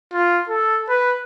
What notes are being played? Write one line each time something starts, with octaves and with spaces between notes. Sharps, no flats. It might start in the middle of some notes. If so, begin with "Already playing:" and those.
F4
A4
B4